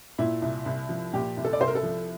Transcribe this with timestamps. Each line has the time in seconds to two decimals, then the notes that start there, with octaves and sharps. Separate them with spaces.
0.18 A#2 E4
0.42 C2
0.66 C2
0.89 F3
1.13 A#2 G4
1.37 C2
1.45 A4
1.53 D5
1.60 C2 C5
1.68 A#4
1.75 A4
1.83 F3